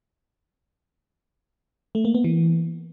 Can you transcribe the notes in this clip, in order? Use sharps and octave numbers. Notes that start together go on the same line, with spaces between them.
A3
A#3
B3
E3